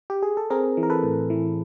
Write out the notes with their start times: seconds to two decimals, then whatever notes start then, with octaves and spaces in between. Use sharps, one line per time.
0.10 G4
0.22 G#4
0.37 A4
0.50 C4 G#4 A#4
0.77 E3
0.83 A#4
0.90 A4 B4
1.03 A2
1.30 E3